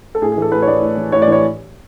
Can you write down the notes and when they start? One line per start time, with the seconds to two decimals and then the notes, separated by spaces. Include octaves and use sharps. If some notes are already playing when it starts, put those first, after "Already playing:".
0.15 A4
0.22 A2 G#4
0.32 G#4
0.37 E3 A4
0.52 A2 B4
0.62 C#5
0.67 E3 D5
0.82 A2
0.97 E3
1.12 A2 C#5
1.22 D5
1.28 E3 C#5